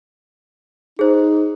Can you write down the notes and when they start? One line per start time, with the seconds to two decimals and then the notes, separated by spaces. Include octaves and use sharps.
0.99 D#4 G#4 C5